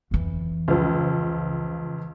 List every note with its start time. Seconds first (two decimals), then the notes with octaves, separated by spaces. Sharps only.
0.11 F2 E3
0.68 C#2 F3